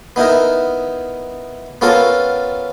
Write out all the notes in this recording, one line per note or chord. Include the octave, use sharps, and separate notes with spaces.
B3 D#4 E4 A#4
B3 C#4 F4 A4 A#4